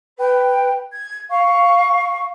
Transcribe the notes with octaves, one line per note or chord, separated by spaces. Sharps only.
B4 G5
G#6
F5 C#6